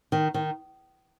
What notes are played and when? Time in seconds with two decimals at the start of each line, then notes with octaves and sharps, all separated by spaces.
0.12 D#3
0.34 D#3